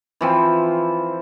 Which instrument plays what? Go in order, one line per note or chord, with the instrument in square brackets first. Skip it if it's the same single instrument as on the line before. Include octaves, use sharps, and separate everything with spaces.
[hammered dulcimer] E3 F3 C4